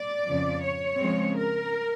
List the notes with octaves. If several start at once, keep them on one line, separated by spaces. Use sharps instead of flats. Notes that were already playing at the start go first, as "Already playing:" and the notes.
Already playing: D5
F2 C#3 F3
C#5
C#3 F3 G#3 C4
A#4